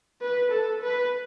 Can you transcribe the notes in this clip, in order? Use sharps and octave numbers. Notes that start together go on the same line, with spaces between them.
B4
A4
B4